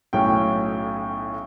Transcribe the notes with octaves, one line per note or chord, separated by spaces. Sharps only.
B1 A2 F#3 C#4 G5